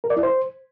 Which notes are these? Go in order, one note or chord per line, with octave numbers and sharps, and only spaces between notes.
A#4
D5
E4
C5